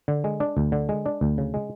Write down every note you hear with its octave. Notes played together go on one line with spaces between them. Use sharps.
D3
G#3
D4
D2
D3
G#3
D4
D2
C#3
G#3